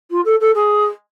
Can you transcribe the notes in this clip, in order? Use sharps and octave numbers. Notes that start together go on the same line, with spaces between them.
F4
A4
A4
G#4